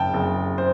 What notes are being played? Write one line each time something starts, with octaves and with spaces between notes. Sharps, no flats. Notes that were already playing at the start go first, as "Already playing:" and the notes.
Already playing: F#1 G5 A5
F#1
C5